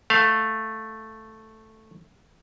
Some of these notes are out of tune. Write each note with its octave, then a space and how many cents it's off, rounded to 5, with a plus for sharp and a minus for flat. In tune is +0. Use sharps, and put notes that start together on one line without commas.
A3 +0 F5 +5